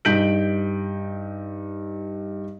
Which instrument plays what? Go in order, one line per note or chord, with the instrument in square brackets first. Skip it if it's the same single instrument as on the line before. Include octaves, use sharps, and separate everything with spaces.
[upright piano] G2 D#4 G6 B6 D7 F#7